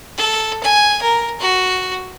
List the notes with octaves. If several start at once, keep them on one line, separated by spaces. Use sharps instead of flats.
A4
G#5
A#4
F#4